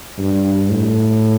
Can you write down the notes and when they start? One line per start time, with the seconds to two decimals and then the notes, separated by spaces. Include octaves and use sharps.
0.19 G2
0.71 A2